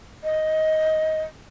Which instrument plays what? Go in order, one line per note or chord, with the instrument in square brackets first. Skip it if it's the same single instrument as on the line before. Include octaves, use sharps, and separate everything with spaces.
[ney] D#5